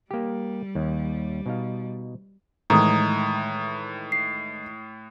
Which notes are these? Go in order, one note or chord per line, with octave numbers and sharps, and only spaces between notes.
G3 A#3 G4
D#2
B2 D#4 F5
A2 D#3 E3 G#3 A#5 D#6
C7